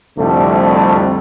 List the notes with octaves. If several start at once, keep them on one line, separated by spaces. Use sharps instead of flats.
C2 F2 D3 G3 A3